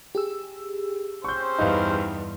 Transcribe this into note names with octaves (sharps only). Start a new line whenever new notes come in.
G4 G#4 E6
C4 C#4 C5 C#6 G6
E2 G2 D#4 B4 F5